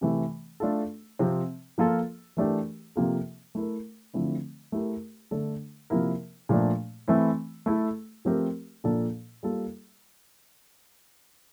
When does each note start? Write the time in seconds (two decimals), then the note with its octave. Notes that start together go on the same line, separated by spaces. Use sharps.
0.01 C3 E3 A3
0.60 A3 D4 F4 A4
1.19 C3 F3 C4
1.78 F3 A#3 F4 A4
2.37 E3 A3 D4 G4 A#4
2.96 C3 F3 A#3 F4 A4
3.55 A3 E4 A#4
4.14 D3 F3 A3 C4 E4
4.72 A3 E4 G4 A#4
5.31 D3 A3 D4 A4
5.90 C3 F3 A#3 E4 A#4
6.49 A#2 F3 A3 D4
7.08 E3 A3 C4 E4
7.66 A3 E4 A4
8.25 F3 A3 C4 G4 A#4
8.84 A#2 F3 A#3 D4 A4
9.43 G3 A#3 F4 A4